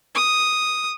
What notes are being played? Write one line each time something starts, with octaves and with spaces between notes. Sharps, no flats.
D#6